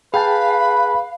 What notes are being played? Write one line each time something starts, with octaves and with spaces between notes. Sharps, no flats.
G#4 B4 F5 G5 A5 B5